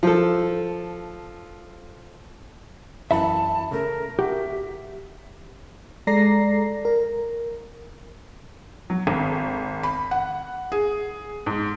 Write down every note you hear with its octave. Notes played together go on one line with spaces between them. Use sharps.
F3 A4
F#2 E3 E5 A5 B5
C#3 A3 A#4
F#4 G4 A#4 E5 F#5
G#3 A4 D5 A#5 A#6 C7
A#4
F#3
G#1
B5
F#5
G#4
G#2